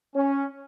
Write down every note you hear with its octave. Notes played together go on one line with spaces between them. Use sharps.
C#4